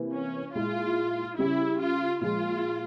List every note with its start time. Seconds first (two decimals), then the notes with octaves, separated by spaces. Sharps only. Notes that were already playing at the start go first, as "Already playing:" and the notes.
Already playing: C3 E3 A#3 E4
0.13 C#4
0.54 A#2 G#3 E4 F4 G#4
1.37 C#3 G3 C#4 E4 G4
1.80 F4
2.21 A#2 F3 G#3 F4